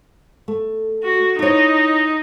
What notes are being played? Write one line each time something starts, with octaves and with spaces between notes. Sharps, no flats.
A3
F#4
D#4 E4 C#5